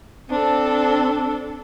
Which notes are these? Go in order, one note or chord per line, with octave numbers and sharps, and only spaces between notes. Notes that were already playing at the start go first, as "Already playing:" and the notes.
C4 D4 A4